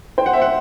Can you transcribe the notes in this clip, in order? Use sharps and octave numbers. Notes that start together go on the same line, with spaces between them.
C5 G5
F#5
E5
F#5